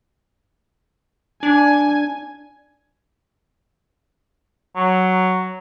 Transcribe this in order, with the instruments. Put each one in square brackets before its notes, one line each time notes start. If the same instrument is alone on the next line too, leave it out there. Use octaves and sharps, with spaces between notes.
[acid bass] D4 [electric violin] G#5
[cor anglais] F#3